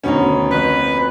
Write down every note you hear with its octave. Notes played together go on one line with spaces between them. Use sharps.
D2 B2 D#3 C#4 D#4
F2 B4 C5